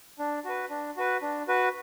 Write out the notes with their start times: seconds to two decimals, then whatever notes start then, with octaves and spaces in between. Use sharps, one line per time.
0.19 D4
0.45 F#4 B4
0.70 D4
0.97 F#4 B4
1.22 D4
1.48 F#4 B4